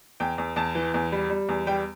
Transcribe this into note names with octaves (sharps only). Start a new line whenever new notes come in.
E2 G5
E2
E2 A5
E3
E2
G3
G3
E2
G3 G5